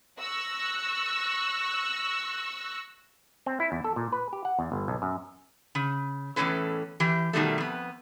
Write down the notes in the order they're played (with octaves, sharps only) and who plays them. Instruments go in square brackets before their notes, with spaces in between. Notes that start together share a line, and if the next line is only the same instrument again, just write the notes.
[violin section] C#6 E6 F#6 A#6
[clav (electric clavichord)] C4
E4
E2
A4
A#2
B4
G4
F#5
E2
G1
B1
F#2
[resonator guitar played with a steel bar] C#3
E2 A2 F#3 C#4 A4 B4
E3 G4
B2 D#3 G3 A3
F2 B3